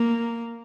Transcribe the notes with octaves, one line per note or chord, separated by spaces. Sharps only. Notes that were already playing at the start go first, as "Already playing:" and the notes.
Already playing: A#3